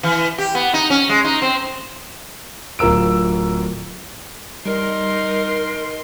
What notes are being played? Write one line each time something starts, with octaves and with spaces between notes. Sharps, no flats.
E3
G4
B3
D#4
C#4
G#3
D#4
C4
D1 F4 A#4 E6 D7
G3 D#4 A#4 C6